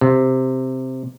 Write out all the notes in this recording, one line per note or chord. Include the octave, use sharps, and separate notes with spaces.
C3